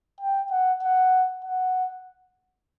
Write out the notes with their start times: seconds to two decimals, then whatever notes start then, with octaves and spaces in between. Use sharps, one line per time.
0.20 G5
0.51 F#5
0.82 F#5
1.45 F#5